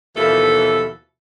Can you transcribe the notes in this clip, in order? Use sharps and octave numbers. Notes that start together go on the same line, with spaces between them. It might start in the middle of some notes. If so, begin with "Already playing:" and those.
D#2 B2 E3 F3 E4 A4